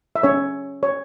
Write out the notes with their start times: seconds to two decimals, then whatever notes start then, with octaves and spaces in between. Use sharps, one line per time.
0.16 E5
0.23 C#4 C#5
0.83 C#5